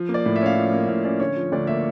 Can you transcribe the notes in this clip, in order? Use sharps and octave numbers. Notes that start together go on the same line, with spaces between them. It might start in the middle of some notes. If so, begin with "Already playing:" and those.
Already playing: F3
A#3
D5
A2
E5
C#4 F5
F3
A#3
A2 F5
C#4 D5
D3 C#5
F3
D2 D5
A#3 E5